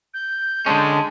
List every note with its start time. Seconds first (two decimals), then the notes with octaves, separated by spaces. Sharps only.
0.14 G6
0.66 D3 G#3 C#4 A5